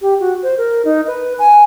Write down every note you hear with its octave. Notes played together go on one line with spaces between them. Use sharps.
G4
F#4
C5
A#4
D#4
B4
G#5